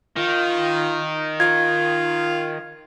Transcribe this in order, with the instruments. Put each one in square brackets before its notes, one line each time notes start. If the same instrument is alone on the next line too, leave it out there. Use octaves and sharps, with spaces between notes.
[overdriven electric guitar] D#3 [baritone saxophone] F4
[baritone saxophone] F4 [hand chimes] G#6